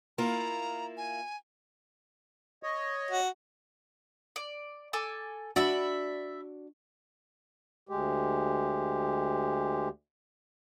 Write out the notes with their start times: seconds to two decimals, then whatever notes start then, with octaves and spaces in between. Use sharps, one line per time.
0.18 A#3 E4 F4 A#5
0.97 G#5
2.63 C#5 D#5
3.11 F#4
4.36 D5
4.93 A4 G#5 D6
5.56 D4 F#4 D5 E5 B5
7.89 D2 G#3 G4